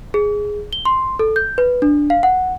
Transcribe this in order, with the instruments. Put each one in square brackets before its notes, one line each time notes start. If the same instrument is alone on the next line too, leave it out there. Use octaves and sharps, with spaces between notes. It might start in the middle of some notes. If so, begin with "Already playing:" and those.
[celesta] G#4
G7
C6
A4
G6
B4
D4
F5
F#5